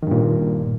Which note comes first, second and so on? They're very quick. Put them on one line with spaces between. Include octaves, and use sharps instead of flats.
D#3 G2 A#2